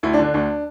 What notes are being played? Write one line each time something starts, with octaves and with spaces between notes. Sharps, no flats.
D2 E4
D4
D3
D4
D2 D4